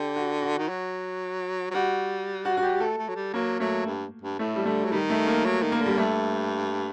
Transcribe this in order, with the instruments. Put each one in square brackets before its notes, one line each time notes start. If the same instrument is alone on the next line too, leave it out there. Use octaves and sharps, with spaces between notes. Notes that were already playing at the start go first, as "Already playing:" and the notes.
Already playing: [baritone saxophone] D3 [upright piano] G4
[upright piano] F#4
F#4
[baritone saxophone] D#3
F#3
F#3
[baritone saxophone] G3 [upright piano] F#4
[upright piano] F#4
F#4
G4
[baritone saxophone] A3 [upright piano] A4
[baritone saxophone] A3
F#3
G3
[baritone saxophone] F#3 [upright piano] A#3
[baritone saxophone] F#3 [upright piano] A3
[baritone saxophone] G2
G2
[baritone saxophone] A2 [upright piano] A3
[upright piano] G3
[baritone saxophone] D3 [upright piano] A3
[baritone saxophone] F#3
[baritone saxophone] D#3 [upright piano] G3
[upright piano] A3
A#3
[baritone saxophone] F#3
D#3
[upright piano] A#3
[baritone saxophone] D3
[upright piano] G3
[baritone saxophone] G2 [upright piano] A3